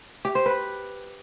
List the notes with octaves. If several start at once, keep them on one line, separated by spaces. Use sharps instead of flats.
G4
C5
B4